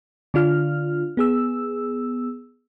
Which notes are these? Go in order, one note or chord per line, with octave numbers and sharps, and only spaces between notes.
D3 D4 F4 F6
B3 G#4 E6